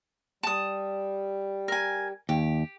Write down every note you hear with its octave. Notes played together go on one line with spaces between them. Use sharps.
G3 A5 D#6
A#4 G#5
D#2 G4